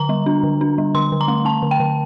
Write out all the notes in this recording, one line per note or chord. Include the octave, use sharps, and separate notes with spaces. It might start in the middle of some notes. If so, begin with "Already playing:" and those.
Already playing: D3 A#5
G3
D4
D3
D4
G3
D3 C6
D3
A#5
A3
A3 A5
D3
G5
D3